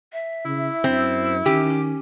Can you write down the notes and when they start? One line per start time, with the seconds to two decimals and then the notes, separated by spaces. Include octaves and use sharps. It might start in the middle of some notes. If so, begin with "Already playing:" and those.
0.13 E5
0.45 C#3 E4
0.84 F#2 C4
1.46 D#3 C#4 G4